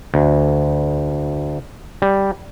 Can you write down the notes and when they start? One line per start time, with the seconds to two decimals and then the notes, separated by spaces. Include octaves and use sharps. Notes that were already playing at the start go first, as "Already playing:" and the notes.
0.14 D2
2.02 G3